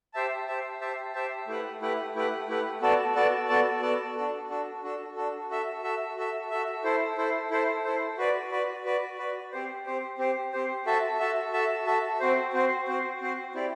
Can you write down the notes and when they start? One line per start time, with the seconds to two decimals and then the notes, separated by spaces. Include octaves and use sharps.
0.14 G4 C5 E5 A5
0.47 G4 C5 E5 A5
0.81 G4 C5 E5 A5
1.14 G4 C5 E5 A5
1.47 A3 E4 G4 B4 F#5
1.81 A3 E4 G4 B4 F#5
2.15 A3 E4 G4 B4 F#5
2.48 A3 E4 G4 B4 F#5
2.81 B3 F#4 A4 D5 A5
3.15 B3 F#4 A4 D5 A5
3.48 B3 F#4 A4 D5 A5
3.82 B3 F#4 A4 D5 A5
4.16 D4 F#4 A4
4.50 D4 F#4 A4
4.83 D4 F#4 A4
5.16 D4 F#4 A4
5.50 F#4 A4 E5
5.83 F#4 A4 E5
6.17 F#4 A4 E5
6.50 F#4 A4 E5
6.84 E4 A4 C5
7.17 E4 A4 C5
7.51 E4 A4 C5
7.84 E4 A4 C5
8.18 F#4 B4 D5
8.51 F#4 B4 D5
8.85 F#4 B4 D5
9.19 F#4 B4 D5
9.52 C4 G4 C5
9.86 C4 G4 C5
10.18 C4 G4 C5
10.53 C4 G4 C5
10.86 F#4 A4 E5 A5
11.19 F#4 A4 E5 A5
11.53 F#4 A4 E5 A5
11.86 F#4 A4 E5 A5
12.20 C4 F#4 C5
12.53 C4 F#4 C5
12.87 C4 F#4 C5
13.21 C4 F#4 C5
13.54 C4 E4 G4 D5